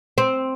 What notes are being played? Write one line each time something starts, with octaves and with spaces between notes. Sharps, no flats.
C4